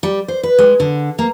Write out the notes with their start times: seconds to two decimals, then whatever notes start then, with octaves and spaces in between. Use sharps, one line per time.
0.03 G3
0.28 C5
0.43 B4
0.58 G#3
0.80 D3
1.19 A#3